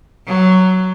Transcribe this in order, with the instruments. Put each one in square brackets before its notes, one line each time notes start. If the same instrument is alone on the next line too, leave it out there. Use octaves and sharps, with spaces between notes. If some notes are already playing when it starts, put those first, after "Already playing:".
[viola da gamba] F#3